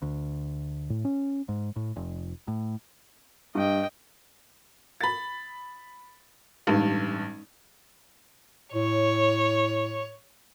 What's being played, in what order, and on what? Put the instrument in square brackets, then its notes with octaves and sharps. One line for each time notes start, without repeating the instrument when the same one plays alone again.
[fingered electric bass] D2
A2
C#4
G#2
A2
F1
A2
[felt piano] G2 [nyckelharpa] D#5 G5
[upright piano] B5 A6
[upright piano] A1 G2 [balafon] G#3 D#4
[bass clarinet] A2 [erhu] C#5